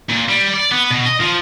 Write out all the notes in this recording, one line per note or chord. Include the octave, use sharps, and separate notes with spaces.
A#2
G3
D5
B3
B2
D#5
F3